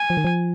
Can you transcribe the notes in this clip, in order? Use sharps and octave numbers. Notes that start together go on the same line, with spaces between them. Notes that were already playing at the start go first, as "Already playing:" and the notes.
Already playing: G#5
F3
D#3
F3